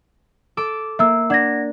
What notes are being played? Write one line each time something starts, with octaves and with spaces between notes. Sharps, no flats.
A4 D6
A#3 E5 E6
D4 F#5 G#6 A#6